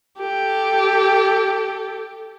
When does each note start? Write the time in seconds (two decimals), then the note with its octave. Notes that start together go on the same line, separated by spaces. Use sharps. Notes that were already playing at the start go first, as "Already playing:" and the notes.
0.19 G4 A4